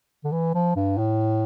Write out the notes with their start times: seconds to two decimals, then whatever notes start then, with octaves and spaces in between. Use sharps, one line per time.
0.24 D3
0.32 E3
0.55 F3
0.76 G2
0.98 A2